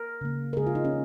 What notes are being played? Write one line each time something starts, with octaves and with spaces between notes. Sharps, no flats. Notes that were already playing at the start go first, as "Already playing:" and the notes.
Already playing: A#4
C#3 A#3
A#4
C#3 G#3 G#4
F4
D#4
C#4